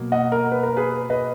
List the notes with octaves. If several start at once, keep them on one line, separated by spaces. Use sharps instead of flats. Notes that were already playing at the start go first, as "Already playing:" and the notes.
Already playing: B2 F#3 A#3
D#5 F#5
A#4
B4
A#4
G#4 B4
B4 D#5